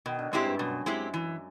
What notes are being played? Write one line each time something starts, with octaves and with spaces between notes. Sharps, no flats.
B2 D#3
D3
G#2 G#3 C4 E4 G4
G2
F#2 B2
G#3 C4 E4 G4
E3